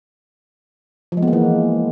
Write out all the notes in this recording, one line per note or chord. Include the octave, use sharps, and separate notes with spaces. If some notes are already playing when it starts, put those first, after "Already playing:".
F3
G#3
B3
A#3
E3